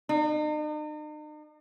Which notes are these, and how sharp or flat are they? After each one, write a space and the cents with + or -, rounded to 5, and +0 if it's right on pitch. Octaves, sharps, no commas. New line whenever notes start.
D#4 -45